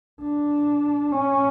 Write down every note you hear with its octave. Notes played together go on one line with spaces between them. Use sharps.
D4
C#4